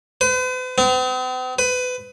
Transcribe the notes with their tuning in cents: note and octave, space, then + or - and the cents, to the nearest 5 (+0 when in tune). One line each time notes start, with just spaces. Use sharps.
B4 +45
C4 -45
B4 +25